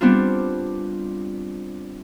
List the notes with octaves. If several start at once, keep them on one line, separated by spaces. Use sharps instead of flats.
G3 B3 C4 D4 F4